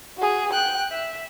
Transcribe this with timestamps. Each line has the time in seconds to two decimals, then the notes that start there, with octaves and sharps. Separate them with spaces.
0.17 F#4 G#4
0.51 G5 F#6
0.91 E5